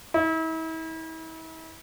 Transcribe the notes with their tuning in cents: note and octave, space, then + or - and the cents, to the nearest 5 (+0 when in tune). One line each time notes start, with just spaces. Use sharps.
E4 -40